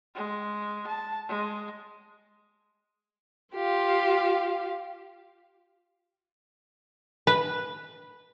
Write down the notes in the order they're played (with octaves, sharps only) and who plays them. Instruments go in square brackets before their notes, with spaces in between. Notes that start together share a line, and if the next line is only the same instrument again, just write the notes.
[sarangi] G#3
A5
G#3
[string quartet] F4 G4 F5
[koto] B4